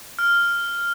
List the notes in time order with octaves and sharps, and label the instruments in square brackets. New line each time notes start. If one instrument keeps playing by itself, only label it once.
[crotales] F6